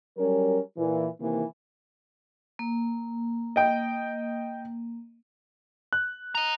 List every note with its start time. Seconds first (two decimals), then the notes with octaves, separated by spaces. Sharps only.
0.17 F#3 G3 C#4 A#4
0.77 A#2 E3
1.20 C3 D#3 E3 A#3
2.59 A#3
3.56 D#5 G5
5.93 F#6
6.35 D#5 A#5